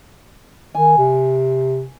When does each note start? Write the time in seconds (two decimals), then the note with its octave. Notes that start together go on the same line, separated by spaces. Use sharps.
0.75 D#3 G#5
0.98 C3